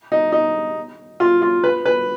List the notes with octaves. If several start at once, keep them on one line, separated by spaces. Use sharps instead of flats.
D#4
D#4
F4
F4
B4
B4